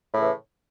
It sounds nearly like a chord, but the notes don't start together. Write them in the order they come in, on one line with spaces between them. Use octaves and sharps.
A2 C#3 E3